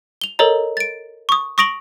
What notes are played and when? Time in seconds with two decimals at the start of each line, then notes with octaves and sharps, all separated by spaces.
0.21 F7 G7
0.39 A4 A#4 C#5 D#5 A#5
0.77 A6 D7
1.29 C#6 D#6
1.58 C#6 D#6 A#6 D7 F7 F#7